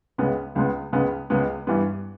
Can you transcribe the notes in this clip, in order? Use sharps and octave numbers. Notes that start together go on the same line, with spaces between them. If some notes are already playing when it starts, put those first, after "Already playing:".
C#2 C#3 G#3 B3
C#2 C#3 G#3 B3
C#2 C#3 G#3 B3
C#2 C#3 G#3 B3
G2 E3 G3 B3